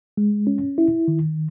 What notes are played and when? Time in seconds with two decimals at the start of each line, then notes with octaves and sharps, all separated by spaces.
0.17 G#3
0.47 C#4
0.78 E4
1.08 D#3